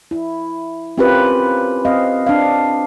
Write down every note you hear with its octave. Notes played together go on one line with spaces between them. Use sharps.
E4
C4 C#4 F4 G4 A#4 B4
C4 D#5 F5
D4 F5